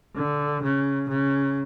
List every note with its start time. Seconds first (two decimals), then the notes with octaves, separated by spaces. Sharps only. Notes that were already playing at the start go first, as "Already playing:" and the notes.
0.16 D3
0.62 C#3
1.09 C#3